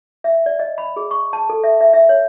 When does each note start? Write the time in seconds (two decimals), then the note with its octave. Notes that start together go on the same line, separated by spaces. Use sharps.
0.24 E5
0.46 D5
0.59 D#5
0.78 B5
0.96 G#4
1.11 C#6
1.33 A5
1.50 A4
1.64 E5
1.81 E5
1.93 E5
2.09 C#5